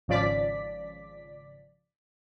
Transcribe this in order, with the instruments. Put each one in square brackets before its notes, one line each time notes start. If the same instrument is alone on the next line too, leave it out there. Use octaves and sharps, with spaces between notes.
[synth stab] G#1 C#3 F3 D5 B6